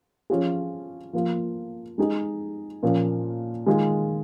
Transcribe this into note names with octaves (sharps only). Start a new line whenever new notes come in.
F3 C#4 F4 G#4
F3 A#3 F4
G#3 D#4 G#4
A#2 F3 A#3 C#4 F4
D#3 G#3 F4 G#4